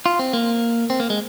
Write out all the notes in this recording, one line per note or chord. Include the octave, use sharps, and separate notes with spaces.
F4
C4
A#3
C4
A#3
G#3